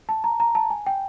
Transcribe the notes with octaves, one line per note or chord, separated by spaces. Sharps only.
A5
A#5
A#5
A5
G#5
G5